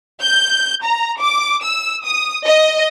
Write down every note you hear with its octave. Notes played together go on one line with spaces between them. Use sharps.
G6
A#5
D6
E6
D#6
D#5